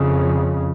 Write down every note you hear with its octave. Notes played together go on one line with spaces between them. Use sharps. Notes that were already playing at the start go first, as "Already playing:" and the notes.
Already playing: F2 C#3